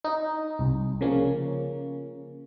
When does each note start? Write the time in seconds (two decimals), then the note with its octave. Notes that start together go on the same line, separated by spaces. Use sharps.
0.04 D#4
0.59 C2
1.01 C#3 F3 A#3 C#4